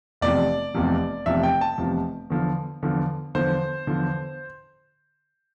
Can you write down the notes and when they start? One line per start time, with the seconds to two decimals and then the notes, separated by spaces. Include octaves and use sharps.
0.21 F1 E2 C3 F3 D5
0.74 F1 E2 C3 F3
1.26 F1 E2 C3 F3 E5
1.43 G5
1.61 A5
1.78 F1 E2 C3 F3
2.30 E2 D3 F3
2.83 E2 D3 F3
3.35 E2 D3 F3 C5
3.87 E2 D3 F3